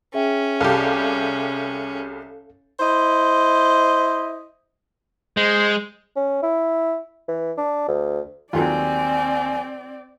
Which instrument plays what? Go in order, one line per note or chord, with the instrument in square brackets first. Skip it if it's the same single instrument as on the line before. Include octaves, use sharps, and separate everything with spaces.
[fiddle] C#4 [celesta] G#4 E5 G5
[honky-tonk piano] C2 G4 [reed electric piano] A4 F5
[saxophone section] E4 C5 D#5
[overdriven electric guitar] G#3 [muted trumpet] C5
[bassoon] C#4
E4
E3
D4
D2
[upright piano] D#2 [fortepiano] F#3 A3 F4 [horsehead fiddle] C4 D5 [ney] G#5